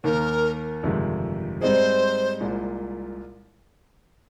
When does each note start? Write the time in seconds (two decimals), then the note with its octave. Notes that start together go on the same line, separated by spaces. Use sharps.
0.04 D#2 D#3 A#3 A#4
0.83 G1 F2 C3 D#3 G#3
1.61 G#2 G3 C4 D#4 G#4 C5
2.40 C2 A#2 G#3